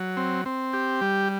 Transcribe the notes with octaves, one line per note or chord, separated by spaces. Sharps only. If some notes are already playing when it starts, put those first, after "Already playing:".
Already playing: F#3
C4
C4
G4
G3